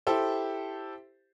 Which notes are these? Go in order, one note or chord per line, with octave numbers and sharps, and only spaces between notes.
E4 G4 A4 C5